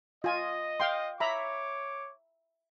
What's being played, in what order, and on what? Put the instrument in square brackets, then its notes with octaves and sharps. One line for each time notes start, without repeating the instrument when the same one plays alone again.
[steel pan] F4 G#5 [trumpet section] D#5
[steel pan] F5 G5 C6
[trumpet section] C#5 D6 [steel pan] E5 A#5 B5